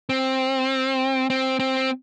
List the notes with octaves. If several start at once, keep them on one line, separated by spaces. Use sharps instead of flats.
C4
C4
C4